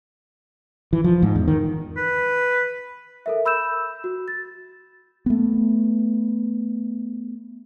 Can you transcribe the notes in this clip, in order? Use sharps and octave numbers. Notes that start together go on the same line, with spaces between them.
E3
F3
G#2
E2
D#3
B4
A4 A#4 E5
B5 E6 G6 E7
F#4
A6
A3 B3